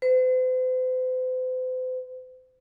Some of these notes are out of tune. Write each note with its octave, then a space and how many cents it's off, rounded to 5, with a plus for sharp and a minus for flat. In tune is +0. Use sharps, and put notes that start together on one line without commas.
C5 -45